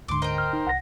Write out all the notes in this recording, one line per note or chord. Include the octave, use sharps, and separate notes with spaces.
D2 G#2 D3 C6 D6
A#4 C5 D#5 G5
F6
D#4
C2 F#5 A#6